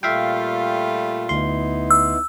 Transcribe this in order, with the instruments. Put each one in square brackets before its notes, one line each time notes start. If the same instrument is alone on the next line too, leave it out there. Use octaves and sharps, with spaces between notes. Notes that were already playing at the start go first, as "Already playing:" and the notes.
[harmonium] A#2 [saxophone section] G3 A3 F4 [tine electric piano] E5 F5 G5
[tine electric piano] D2 C6 [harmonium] B3 D#4 E4
[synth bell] E6